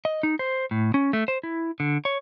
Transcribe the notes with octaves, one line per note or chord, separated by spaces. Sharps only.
D#5
D#4
C5
A2
C#4
A3
C5
E4
D3
C#5